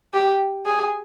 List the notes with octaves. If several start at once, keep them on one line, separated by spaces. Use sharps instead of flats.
G4
G#4